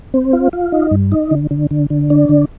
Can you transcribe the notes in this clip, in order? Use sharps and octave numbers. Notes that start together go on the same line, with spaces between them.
C4
F4
F4
D#4
G2
D#4
D3
D3
D3
D3
D4
D3